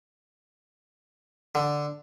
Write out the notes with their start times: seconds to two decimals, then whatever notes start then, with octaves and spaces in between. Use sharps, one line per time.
1.55 D3